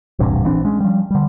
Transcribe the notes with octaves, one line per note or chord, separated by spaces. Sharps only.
D#1 A1 G2 C3
A#1 E3 C4 D4
G#3 C#4
F3 G3
D3 G3